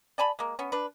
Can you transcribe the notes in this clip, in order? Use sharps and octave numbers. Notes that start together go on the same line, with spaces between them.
D5 G#5 A5 B5
G#3 A#3
B3 C#4
D4 B4